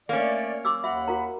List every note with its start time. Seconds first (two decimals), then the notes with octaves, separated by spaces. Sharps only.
0.09 A3 A#3 C#4 D5
0.65 C6 D6 E6
0.84 D#2 E5 F#5 B5 C6
1.08 F#4 A#4 A#5